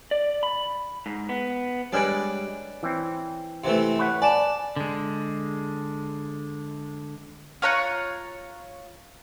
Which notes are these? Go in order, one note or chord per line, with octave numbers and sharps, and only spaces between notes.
D5
B5
G#2
B3
G3 G#3 D4 B4 C#5 G#5 D7
E3 C4
C3 E3 A3
B4 C#5 F#5
D5 G#5 A5 E7
D3 G#3
F4 C#5 A#5 F#6